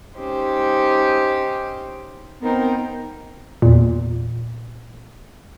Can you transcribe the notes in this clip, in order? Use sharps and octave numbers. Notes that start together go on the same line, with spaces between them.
G#3 C#4 D#4 G4 C5
B3 C4 D#4 A#4 C5 G5
E2 A#2